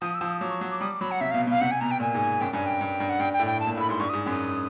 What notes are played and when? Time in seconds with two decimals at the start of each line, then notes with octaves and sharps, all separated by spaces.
0.01 F3 D#6
0.14 E6
0.21 F3
0.28 D#6
0.41 F#3 D6
0.51 C#6
0.61 F#3
0.71 D6
0.81 G3 D#6
0.91 D6
1.01 F#3 B5
1.11 F#5
1.21 C3 E5
1.31 B2 F5
1.47 B2
1.50 F5
1.61 C3 F#5
1.71 G#5
1.81 B2 A#5
1.91 G5
2.00 A#2 G#5
2.14 G#2
2.41 F#2 G5
2.53 G2 G#5
2.66 G5
2.81 G2
3.00 G2
3.09 F#5
3.19 G2 G5
3.33 G5
3.39 A2
3.46 G5
3.60 A5
3.67 A#2
3.78 A2 B5
3.89 G#2 C6
4.00 G2 C#6
4.09 G#2 D#6
4.26 F#2
4.29 D#6